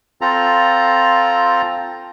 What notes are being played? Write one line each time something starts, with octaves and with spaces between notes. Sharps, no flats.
C4 F4 A4 A#5